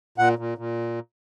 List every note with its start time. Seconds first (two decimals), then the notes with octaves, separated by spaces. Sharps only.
0.18 A#2 F#5
0.39 A#2
0.58 A#2